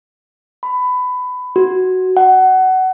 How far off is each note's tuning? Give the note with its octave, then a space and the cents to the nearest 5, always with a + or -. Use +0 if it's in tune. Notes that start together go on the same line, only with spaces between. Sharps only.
B5 +20
F#4 +5
F#5 +20